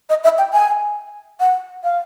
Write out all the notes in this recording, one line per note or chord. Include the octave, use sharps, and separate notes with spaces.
D#5
E5
G5
G#5
F#5
F5